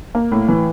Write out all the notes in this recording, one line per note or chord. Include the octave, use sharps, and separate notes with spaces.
A#3
A2
E3